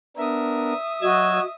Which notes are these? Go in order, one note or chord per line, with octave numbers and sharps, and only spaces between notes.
B3 D4 A#4 E5 D#6
F#3 F#4 D#5 E6 G#6